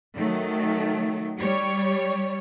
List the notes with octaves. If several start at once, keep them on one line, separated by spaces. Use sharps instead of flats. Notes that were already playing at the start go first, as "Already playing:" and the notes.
D#3 F#3 A3
G3 C#5